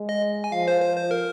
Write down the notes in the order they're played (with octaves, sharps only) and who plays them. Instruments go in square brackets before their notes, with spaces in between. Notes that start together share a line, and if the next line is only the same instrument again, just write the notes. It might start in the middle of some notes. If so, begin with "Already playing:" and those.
Already playing: [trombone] G#3
[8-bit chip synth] D#5
G#5
[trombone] F3 [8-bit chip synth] F5
[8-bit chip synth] C5
C5
C5
A#4